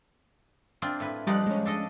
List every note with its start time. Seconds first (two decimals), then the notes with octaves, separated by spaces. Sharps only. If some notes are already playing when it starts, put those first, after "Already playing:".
0.82 C4 D4 F4
1.00 A2 B4 G#5
1.27 F3 G3 D#4 D5 F#6
1.47 G#3 C#4
1.66 D4 A4 D#5